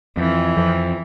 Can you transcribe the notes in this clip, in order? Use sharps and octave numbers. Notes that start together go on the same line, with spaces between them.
F2 E3
F2